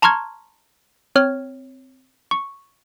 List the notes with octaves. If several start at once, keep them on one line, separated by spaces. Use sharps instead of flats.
A5 A#5 C6 C#6 F6 G#6
C4 C#5 F6
C#6